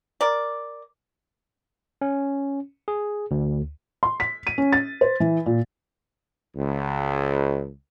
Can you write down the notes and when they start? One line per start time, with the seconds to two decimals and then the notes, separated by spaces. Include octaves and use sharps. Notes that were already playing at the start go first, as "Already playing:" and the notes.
0.21 A#4 D5
2.01 C#4
2.88 G#4
3.31 D2
4.03 C6
4.20 B6
4.47 D#7
4.58 C#4
4.73 A6
5.01 C5
5.20 E3
5.46 A#2
6.56 C#2